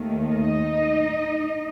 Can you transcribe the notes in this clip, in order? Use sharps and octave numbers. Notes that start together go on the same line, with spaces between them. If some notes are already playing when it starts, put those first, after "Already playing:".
Already playing: D#2 D#3 A3
D#4 D#5